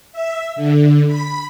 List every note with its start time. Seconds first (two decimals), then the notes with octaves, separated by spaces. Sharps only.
0.12 E5
0.56 D3
1.07 B5